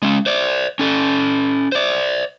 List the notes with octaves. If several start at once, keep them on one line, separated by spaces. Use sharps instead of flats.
G#3 C#4
C5 D5
C#4 A4
C5 D5